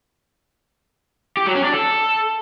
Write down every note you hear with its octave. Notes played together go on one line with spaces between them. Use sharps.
G4
F#3
C#4
D4
A4